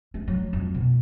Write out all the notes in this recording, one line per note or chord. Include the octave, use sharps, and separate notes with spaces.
G#3
F#3
F2
B2